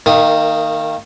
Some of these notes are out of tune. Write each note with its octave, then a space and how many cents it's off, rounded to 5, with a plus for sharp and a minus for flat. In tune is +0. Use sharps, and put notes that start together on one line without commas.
D#3 +0 A#3 -25 D#6 +0